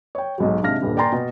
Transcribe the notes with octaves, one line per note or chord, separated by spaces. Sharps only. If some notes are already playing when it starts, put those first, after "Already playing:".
C#5 G5
B1 G#2 F#3
G#2 C3 D4 F5 F6 A#6
D#1 G2 D3
D5 G5 G#5 A#5 C6 A6
B2